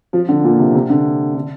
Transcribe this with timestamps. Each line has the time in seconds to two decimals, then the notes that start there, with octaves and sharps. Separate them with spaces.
0.13 F3
0.29 D3
0.44 A#2
0.59 C3
0.74 C3
0.90 D3
1.35 D3